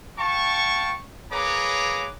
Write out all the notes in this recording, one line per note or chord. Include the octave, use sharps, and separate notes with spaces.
F5 G5 A5 C#6
A#3 G#4 B4 C#5 A#5 D6